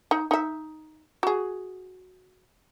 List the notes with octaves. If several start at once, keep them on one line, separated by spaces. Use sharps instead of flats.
D#4
D#4 E5
F#4 G#4